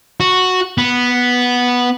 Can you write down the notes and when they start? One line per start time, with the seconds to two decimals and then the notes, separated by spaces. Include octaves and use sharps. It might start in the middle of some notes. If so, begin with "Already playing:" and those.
0.20 F#4
0.78 B3